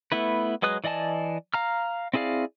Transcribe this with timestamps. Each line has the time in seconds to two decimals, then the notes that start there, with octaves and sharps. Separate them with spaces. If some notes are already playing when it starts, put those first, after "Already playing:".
0.12 A3 B3 E4 B4
0.62 F#3 G#3 B4 D#6 F#6
0.84 E3 D5 D#5 G#5 A5
1.54 F5 A#5 F6
2.14 C4 E4 G#4 D5 F5